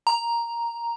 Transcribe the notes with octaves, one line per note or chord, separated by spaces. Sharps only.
A#5